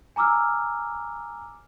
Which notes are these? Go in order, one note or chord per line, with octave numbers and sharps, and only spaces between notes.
G#5 A#5 D6 E6 F6